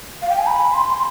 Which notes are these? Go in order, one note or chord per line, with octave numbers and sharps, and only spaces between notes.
F5
G5
G#5
B5
C6